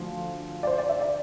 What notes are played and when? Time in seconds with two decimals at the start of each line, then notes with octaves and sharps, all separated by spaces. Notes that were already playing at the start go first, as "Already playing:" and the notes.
Already playing: D2 D3 F3
0.63 D5
0.67 C5
0.78 D5
0.89 E5
1.00 D5